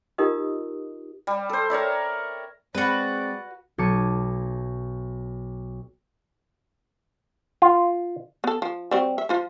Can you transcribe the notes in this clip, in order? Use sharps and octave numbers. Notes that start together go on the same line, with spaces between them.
D#4 F4 G4 A#4 D#5 D#6
G3
A4 C5
A#4 C#5 D5 E5
G#3 C4 F#4 B4 D5
B1 A5 D6 G#6 C#7 D#7
F4
B3 A4
F3
G3 C4 F#4
E5
F3 F4 C5